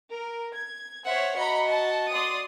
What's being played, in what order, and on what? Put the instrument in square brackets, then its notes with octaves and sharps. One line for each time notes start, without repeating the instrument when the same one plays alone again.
[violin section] A#4
G#6
[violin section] C5 C#5 [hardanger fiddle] E5 F#5
[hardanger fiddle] F#4 D#5 [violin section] A#5 B5 C#7
[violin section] A5
D5 C6 D#6